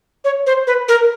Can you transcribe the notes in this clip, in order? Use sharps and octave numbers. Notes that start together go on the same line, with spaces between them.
C#5
C5
B4
A#4